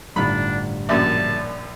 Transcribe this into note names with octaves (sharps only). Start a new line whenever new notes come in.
G1 A2 D4 D#4 F4 B5
A#1 F#2 C#5 D5 E5 A5